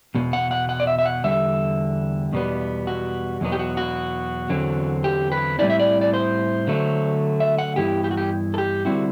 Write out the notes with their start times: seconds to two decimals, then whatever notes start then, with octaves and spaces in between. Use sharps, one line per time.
0.15 E2 B2
0.33 F#5
0.51 F#5
0.69 F#5
0.80 D5
0.87 E5
0.99 E5
1.06 F#5
1.24 E2 D3 G3 E5
2.33 E2 B2 G3 B3
2.87 F#4
3.41 E2 B2 F#3 B3
3.52 G4
3.59 F#4
3.77 F#4
4.50 E2 D3 F#3 C4
5.04 G4
5.32 B4
5.59 A2 G3 C4 E4 D5
5.70 E5
5.80 D5
6.01 D5
6.14 C5
6.67 D3 F#3 A3
7.40 E5
7.58 F#5
7.76 G2 E3 B3 E4 G4
8.04 G4
8.11 F#4
8.17 G4
8.54 A4
8.58 G4
8.85 D3 G3 C4 E4 F#4